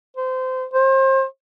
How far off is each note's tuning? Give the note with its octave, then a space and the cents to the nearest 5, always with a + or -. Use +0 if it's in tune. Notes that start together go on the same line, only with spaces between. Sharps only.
C5 -25
C5 +35